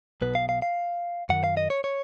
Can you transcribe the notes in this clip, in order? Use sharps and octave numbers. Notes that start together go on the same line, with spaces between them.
B1 B2 B4
F5
F5
F5
F#2 D#3 F#5
F5
D#5
C#5
C#5